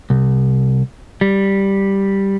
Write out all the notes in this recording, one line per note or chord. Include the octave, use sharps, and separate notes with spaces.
C2
G3